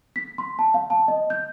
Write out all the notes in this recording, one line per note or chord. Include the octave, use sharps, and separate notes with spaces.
B6
C6
A5
F5
A5
D#5
G6